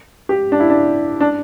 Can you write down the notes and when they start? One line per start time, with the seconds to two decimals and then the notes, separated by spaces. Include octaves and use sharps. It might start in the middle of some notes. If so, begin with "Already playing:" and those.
0.29 G4
0.52 D4
0.60 E4
0.70 D4
1.20 D4